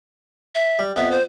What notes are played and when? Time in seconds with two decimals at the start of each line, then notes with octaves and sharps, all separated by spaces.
0.55 E5
0.79 G3
0.96 F2 B3 E5
1.11 C5